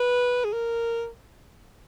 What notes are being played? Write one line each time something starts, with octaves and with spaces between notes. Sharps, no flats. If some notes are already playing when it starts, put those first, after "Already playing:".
Already playing: B4
G#4
A#4